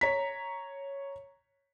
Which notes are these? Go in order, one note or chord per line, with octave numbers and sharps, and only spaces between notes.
C#5 A#5 B6